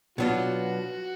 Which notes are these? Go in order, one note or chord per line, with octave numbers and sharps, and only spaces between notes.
B2 F#3 B3 D4 F4 F#4